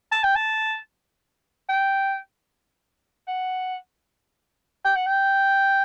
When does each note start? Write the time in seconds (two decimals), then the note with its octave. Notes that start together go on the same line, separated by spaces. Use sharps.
0.12 A5
0.24 G5
0.36 A5
1.69 G5
3.28 F#5
4.85 G5
4.96 F#5
5.06 G5